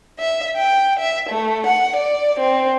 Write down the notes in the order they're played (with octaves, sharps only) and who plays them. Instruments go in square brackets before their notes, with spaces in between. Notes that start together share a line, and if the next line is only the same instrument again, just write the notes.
[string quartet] E5
G5
E5
A3
F#5
D5
C4